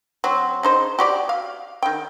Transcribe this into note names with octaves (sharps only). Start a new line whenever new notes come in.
F#3 C4
C#3 D#4 C5
F#4 G4 D5
F5
D#3 G5